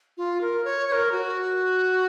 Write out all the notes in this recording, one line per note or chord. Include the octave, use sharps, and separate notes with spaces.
F4
A#4
C#5
C#5
A#4
F#4